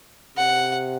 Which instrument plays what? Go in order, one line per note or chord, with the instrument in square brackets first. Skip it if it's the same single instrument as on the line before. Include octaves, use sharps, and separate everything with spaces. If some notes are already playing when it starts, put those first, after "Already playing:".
[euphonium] C3 [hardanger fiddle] F#5